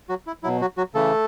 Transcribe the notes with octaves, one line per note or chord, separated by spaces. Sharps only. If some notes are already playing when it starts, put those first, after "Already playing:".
F#3 F#4
E4
B2 F#3 E4
F#3 F#4
F#3 F#4
C#3 E3 A3 A4